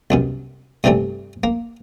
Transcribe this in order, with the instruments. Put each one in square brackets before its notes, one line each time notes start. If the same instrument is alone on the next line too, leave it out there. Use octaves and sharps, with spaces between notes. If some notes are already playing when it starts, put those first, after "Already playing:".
[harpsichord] C2 F#2 B2
G2 C3 E3 G3 A3
A#3